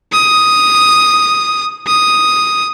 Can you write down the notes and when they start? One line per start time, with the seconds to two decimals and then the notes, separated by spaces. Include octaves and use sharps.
0.13 D#6
1.87 D#6